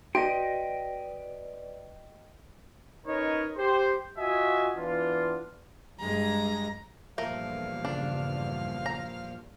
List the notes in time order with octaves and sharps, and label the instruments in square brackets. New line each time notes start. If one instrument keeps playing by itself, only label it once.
[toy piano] F#4 [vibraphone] B4 D5 [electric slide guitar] D#5 G5
[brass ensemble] C#4 D#4 A#4 B4 C#5 D#5
G4 C5
F4 F#4 D#5 E5 G#5
E3 B3 D4 F4
[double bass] G2 G#3 [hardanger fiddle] A#5
[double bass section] E2 G2 [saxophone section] A#2 F3 F5 [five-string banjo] A3 A#4
[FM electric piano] C#3 [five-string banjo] D4
[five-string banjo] A#5